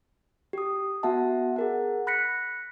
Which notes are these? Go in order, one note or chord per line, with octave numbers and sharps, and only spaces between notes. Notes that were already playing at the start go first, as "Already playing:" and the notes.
G4 D#6
B3 F#4 E5 F#5 A5
G#4 A#4 F#5
B5 F#6 A#6 B6 C#7